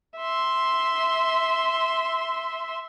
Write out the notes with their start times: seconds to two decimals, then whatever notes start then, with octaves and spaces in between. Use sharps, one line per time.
0.17 E5 C6